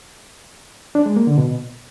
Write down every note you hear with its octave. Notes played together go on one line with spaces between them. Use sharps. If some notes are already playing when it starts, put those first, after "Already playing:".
D4
G#3
A#3
D3
B2